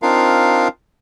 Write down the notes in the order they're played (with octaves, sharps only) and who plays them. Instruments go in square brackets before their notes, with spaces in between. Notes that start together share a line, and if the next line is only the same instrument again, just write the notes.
[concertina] C4 D4 D#4 F4 A#4 F5